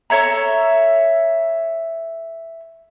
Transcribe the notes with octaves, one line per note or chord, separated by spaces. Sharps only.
A4 C#5 E5 A#5